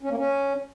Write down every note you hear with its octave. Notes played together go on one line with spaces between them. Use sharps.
C#4
A#3
C#4